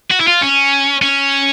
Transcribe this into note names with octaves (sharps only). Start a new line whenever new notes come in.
F#4
E4
F4
C#4
C#4